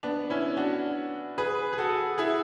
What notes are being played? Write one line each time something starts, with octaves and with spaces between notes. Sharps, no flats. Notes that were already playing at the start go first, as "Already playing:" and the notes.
B3 D4
C#4 E4
D4 F#4
G#4 B4
G#4
F#4 A4
E4 G#4